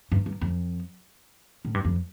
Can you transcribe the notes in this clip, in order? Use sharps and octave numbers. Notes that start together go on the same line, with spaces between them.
G2
G2
F2
A2
G2
F2